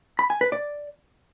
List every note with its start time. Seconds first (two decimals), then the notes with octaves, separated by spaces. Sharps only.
0.19 B5
0.30 G#5
0.41 B4
0.52 D5